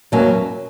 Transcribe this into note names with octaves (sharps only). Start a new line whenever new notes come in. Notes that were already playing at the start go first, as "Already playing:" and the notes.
E2 B2 F#3 A#3 C#4